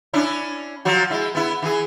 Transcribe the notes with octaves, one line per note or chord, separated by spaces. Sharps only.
C#4 D4 E4
F3 F#3 F#4
G#3 E4
B3 E4
E3 G#4